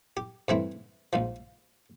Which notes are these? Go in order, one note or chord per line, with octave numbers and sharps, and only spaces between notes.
G4
G2 E3 A3 C4 E4
A#1 G#2 F3